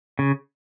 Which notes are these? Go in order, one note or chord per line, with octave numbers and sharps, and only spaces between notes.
C#3